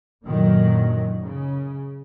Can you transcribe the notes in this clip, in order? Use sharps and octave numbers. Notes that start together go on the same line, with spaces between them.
F#2 A#2 D3 D#3 F#3
C#3